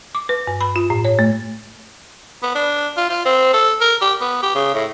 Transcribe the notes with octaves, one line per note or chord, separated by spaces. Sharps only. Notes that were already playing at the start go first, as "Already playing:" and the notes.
D6
B4
G2
B5
F4
A2
C#5
A3
B3
D4
F4
F4
C4
A4
A#4
G4
B3
G4
C#3
A2